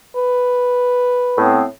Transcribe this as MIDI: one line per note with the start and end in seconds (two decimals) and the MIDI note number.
0.16 1.56 71
1.37 1.63 45
1.37 1.63 59
1.37 1.63 60